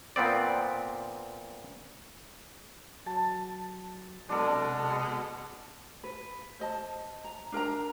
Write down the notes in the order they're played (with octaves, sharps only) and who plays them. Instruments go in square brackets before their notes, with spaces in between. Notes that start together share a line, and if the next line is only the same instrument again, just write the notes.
[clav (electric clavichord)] A#2 B3 C4 D5
[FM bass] F#3 [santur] A5
[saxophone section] B2 G#3 [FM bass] F#3 [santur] D4 A4
[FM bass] C3
[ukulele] B4
C5 D#5 A5
A#5
D4 A#4 G5 A#5